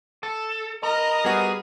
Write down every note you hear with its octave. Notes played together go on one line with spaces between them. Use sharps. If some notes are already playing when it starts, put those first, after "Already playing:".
A4
A#4 D#5 A5 A#5
G3 B3 F#4 G#4